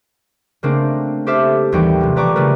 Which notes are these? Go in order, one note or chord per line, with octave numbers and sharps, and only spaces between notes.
C#3 A3 A#3 C4 D4 A#4
G4 A4 C5 E5 D6 F6
A1 D#2 E3 G3 F#4 G5
C3 F3
A4 B4 D5 A#5 C#6 D6
C#3 F3 G3 A3 A#4 B4